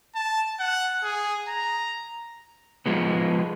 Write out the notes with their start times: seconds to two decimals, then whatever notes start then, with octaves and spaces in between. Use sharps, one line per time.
0.15 A5
0.60 F#5
1.04 G#4
1.49 A#5
2.86 F3 G#3 B3